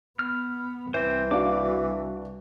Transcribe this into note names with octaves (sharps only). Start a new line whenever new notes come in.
B3 F6
C2 E3 C4 C5
D4 F#4 F5 D6